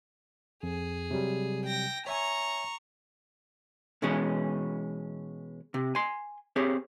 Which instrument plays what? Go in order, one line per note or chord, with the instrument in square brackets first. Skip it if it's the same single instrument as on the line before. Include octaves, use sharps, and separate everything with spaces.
[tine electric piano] F2 [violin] G#4
[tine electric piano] C3 F#3 G3
[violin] G5 A#6
[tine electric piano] C#5 E5 G#5 [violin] A#5 C#6
[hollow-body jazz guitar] B2 E3 G#3 C#4 G#4
C3
G#5 C6
C4 G4 G#4 C#5